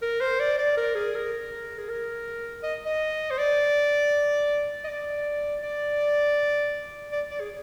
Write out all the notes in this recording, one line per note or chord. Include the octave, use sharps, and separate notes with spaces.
A#4
C5
D5
D5
A#4
G#4
A#4
G#4
A#4
D#5
D#5
C5
D5
D#5
D5
D5
D5
D5
G#4